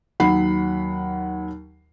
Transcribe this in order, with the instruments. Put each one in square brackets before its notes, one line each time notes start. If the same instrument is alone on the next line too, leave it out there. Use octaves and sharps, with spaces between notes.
[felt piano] D#2 F#3 F#5 B5 C7